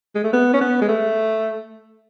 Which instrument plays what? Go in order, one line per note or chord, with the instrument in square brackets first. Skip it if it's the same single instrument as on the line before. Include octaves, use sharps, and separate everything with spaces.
[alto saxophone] G#3
A3
B3
C#4
B3
G#3
A3